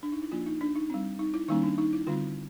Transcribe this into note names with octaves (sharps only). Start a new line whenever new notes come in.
D4
D#4
E4
F3 A#3 D4 F4
D#4
D4
D#4
G3 C4
D#4
E4
D#3 G3 A#3 C#4 D#4
D4
D#4
E4
D3 G3 C4 F4